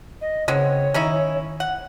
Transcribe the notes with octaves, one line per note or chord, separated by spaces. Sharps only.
D#5
C#3 G#3 B3 C4 C#5
D#3 C#4 D#4 E4
F#5